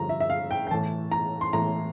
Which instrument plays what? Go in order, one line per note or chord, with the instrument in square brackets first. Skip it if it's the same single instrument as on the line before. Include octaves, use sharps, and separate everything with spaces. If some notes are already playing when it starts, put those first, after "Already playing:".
Already playing: [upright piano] G2 D3 F3 A#5
E5
E5
F5
G5
G5
A2 E3 A5
A#5
C6
A2 E3 A#5